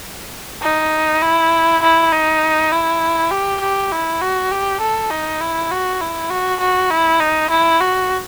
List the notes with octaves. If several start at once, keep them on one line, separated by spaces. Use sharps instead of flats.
D#4
E4
E4
D#4
E4
G4
G4
E4
F#4
G4
A4
D#4
E4
F#4
E4
F#4
F#4
E4
D#4
E4
F#4